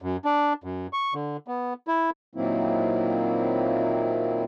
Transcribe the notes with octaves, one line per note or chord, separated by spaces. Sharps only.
F#2
D4
F#2
C#6
D3
B3
E4
A#2 D#3 F#3 A#3 C4 E4